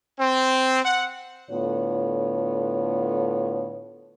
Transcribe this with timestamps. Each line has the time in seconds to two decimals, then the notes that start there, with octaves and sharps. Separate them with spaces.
0.19 C4
0.85 F#5
1.51 A2 D3 B3 F4 C#5